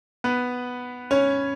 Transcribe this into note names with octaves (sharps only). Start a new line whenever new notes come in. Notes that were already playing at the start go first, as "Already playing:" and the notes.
B3 B4
C#4 C#5